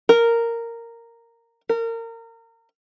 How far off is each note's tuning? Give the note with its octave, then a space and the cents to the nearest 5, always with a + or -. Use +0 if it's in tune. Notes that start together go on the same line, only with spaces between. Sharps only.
A#4 -10
A#4 -30